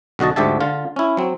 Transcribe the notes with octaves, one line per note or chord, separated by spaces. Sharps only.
B1 D3 F#4 D#5 A5
D2 G#2 D3 G4 E5 A5
D3 F4
C#4 E4
F#3 C4